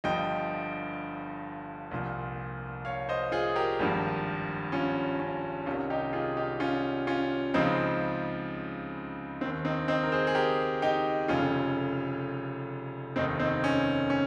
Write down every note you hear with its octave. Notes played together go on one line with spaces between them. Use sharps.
G1 G2 F3 D#5 G5
C2 A#2 F3
C#5 F5
C5 D#5
F4 G#4
G4 A#4
G#1 G2 F3
C#4 F4
C#4
C2 C3 D#3 C#4 F4
D#4 G4
F4 G#4
D#4 G4
C#4 F4
C#4 F4
C#2 C#3 F3 C4 D#4
D#2 D#3 C4
C4 D#4
C4 D#4
A#4
G#4 C5
G#4
G4 A#4
D#4 G4
F1 F2 C#3 C#4 F4
F1 D#2 D#3 C4 D#4
C4 D#4
C#4
C#4